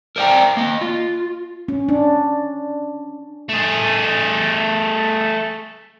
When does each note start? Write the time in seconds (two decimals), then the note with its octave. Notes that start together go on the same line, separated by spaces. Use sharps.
0.16 A#4 C5 D5 D#5 G5 A#5
0.57 A#3 D#5
0.81 F4
1.68 C#4
1.89 D4
3.49 A3 G#4